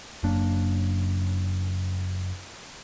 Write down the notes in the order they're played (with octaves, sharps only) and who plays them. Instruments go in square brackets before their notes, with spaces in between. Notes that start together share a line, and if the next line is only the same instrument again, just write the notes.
[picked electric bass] F#1 F#2 A#3 D4